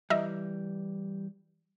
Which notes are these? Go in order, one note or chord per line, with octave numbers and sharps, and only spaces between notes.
E3 G3 D#5 E5 A#5